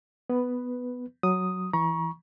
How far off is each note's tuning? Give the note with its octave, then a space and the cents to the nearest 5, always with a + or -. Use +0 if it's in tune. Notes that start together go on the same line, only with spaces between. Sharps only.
B3 +10 B4 +0
F#3 +0 D#6 +0
E3 +5 A#5 +40 C#6 +0